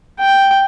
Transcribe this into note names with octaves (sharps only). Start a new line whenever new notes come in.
G5